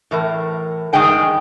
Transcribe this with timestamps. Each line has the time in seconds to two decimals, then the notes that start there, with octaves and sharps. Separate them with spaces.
0.11 A2 E3 A#4
0.93 G2 D#3 G#3 G#4 G5 G#5